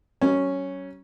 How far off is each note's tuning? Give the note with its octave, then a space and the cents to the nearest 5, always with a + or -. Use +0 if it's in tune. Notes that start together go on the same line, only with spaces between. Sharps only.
F#3 +40 C#4 +0 C#5 +0